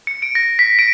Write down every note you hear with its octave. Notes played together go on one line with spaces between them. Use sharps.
C#7
D7
A#6
B6
D7